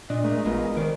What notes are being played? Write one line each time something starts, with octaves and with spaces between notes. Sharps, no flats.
A#2 D4 D#5
G#3 A3 A#4 D#5
A1 B3 F4 F#4
D#3 A#4 C5 D5